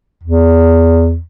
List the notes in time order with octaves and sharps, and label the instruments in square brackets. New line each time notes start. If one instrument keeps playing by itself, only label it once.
[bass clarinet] E2